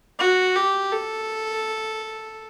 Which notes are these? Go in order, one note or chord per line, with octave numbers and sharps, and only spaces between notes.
F#4
G4
A4